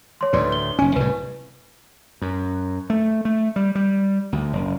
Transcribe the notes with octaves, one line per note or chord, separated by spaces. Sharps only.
C#5 C6
D2 A2 B4 D5 C6
G7
F#1 C#4 G#5
C2 A2 B4
F#2
A3
A3
G3
G3
D2
F#1